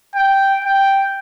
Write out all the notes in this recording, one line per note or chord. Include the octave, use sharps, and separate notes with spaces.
G5
G5